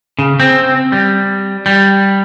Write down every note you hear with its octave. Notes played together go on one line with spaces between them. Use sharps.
C#3
C4
G3
G3